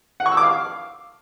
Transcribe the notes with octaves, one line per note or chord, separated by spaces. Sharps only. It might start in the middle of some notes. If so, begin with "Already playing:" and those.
F#5
C#6
E6
D6
F5